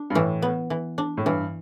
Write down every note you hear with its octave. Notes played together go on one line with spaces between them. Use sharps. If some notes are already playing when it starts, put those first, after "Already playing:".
Already playing: D4
G2
A2 E3
B3
E3
D4
A2
G2 E3